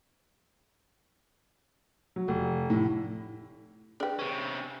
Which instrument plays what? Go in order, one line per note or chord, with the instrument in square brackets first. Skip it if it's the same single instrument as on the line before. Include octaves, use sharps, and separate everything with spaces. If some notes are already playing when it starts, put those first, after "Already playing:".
[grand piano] F#3
F1
A2
[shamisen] D4 G4 [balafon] G#4 B4
[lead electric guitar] C3 C#4